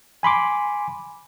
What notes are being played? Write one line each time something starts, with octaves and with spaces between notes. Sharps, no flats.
G#5 B5 C6 D6